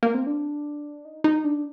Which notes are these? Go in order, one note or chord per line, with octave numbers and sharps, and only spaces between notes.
A#3
C4
D4
D#4
D#4
D4